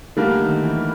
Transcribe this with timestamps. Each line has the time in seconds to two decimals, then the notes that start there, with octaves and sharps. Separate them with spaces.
0.17 D3 G3 A3 A#3
0.40 D#3
0.63 E3